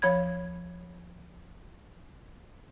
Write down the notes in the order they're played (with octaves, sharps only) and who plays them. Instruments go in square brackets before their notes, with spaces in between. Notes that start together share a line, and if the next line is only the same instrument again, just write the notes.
[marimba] D2 F3 C#5 B5 G#6